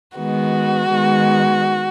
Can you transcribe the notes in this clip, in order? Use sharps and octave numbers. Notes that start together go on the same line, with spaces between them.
D#3 G#3 B3 F#4
D#3 G#3 B3